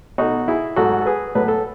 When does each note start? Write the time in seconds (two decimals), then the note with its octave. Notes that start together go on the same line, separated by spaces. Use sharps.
0.18 B2 A3 D#4 F#4
0.48 E4 G#4
0.76 G#2 F#3 A3 F#4 A4
1.01 A4
1.06 G#4 B4
1.35 A2 F#3 A3 B4
1.48 A4